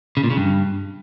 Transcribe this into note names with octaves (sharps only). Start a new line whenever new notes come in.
C#3
A#2
C#3
G2